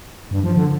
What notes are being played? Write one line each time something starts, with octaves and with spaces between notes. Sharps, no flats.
G2
F3
D3